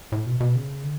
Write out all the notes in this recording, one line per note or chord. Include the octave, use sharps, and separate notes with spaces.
A2
B2
B2
C#3
D3